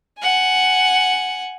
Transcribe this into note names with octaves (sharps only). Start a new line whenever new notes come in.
F#5 G#5